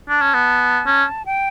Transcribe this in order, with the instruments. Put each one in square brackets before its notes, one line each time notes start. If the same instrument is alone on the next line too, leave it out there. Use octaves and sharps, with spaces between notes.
[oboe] D4 [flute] A5
[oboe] C#4
B3
C#4
[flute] G5